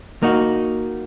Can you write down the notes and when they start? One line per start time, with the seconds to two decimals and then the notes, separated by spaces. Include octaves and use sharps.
0.23 A#3 D#4 F#4